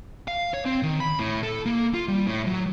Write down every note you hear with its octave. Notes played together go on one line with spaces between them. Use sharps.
F5
C#5
C4
D#3
B5
A2
A4
A#3
F4
G3
A2
F#3